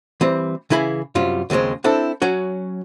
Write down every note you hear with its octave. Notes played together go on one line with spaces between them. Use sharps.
E3 G3 C4
C#3 E3 E4 G#4 B5
F#2 C3 G3 F4
D#2 C#3 F3 G#3 C4
C4 D4 E4 A4
F#3 C#4 F#4